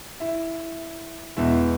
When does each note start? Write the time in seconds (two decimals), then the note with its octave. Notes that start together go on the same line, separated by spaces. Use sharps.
0.20 E4 E5
1.37 E2 B2 G#3 E4 E5